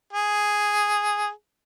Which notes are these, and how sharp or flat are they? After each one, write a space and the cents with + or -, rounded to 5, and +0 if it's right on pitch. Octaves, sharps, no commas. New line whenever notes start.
G#4 +0